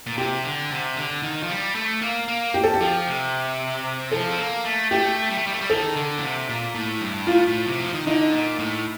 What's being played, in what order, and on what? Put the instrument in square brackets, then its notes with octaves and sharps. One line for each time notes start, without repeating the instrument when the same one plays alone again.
[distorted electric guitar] A#2
[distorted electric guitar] C3 [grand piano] G4
[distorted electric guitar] D3
C3
D3
D#3
F3
G3
A3
A#3
A#3
[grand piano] G4
A4
G4
[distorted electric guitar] F3
C3
[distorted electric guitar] F3 [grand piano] A4
[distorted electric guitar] C4
A#3
A3
[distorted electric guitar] A3 [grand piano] G4
[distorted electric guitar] G3
A3
G3
A3
G3
[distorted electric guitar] D#3 [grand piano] A4
[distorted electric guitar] D3
A#2
C3
A#2
A2
G2
[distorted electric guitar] A2 [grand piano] F4
[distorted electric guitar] A2
C3
F3
D#3
[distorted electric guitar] D3 [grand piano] D#4
[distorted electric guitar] A#2
A2